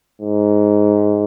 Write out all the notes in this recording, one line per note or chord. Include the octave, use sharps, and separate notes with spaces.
G#2